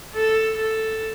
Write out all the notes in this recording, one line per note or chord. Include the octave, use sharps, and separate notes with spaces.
A4
A4